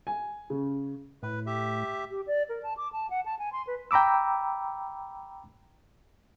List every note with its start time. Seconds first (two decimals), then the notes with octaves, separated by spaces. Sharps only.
0.07 G#5
0.50 C#3
1.23 A2 B4
1.46 G4 E5
2.10 G4
2.27 D5
2.49 A#4
2.63 A5
2.77 D6
2.93 A5
3.10 F#5
3.26 A5
3.39 G#5
3.53 C6
3.67 B4
3.91 G5 A#5 B5 D6 E6